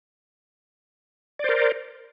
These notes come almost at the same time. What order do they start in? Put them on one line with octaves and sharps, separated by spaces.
D5 C5 A#4